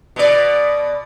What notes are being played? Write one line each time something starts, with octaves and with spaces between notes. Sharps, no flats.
B2 D5